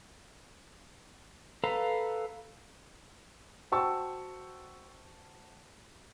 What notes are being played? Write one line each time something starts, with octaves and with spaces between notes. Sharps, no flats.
A4 B4 F5 A#5
F#4 C5 G5 A5 C#6 E6